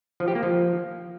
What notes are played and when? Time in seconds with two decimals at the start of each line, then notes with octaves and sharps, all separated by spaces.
0.20 F3
0.28 G4
0.35 A#3
0.43 F3